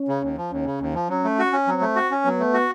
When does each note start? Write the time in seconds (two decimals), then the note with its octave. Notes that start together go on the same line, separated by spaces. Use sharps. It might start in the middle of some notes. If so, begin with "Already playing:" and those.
Already playing: C#4
0.08 C#3
0.22 D#2
0.37 F3
0.51 D#2 C#4
0.66 C#3
0.80 D#2
0.94 F3
1.09 F#3 C#4
1.24 A3
1.39 F#4
1.53 C#4
1.67 F#3 C4
1.81 A3
1.96 F#4
2.11 C#4
2.25 F#3 B3
2.40 A3
2.54 F#4